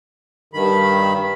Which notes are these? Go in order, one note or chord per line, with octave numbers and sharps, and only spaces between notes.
G2 D#3 B5